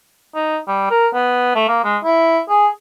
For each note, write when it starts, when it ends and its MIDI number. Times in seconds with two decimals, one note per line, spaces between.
0.35 0.58 63
0.68 0.86 55
0.91 1.08 70
1.14 1.51 59
1.55 1.68 57
1.68 1.82 58
1.84 1.98 56
2.04 2.40 64
2.50 2.67 68